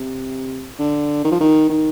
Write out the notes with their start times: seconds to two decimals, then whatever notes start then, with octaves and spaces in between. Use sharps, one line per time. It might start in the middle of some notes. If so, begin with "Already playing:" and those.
Already playing: C3
0.79 D3
1.24 D#3
1.32 F3
1.40 D#3
1.69 D#3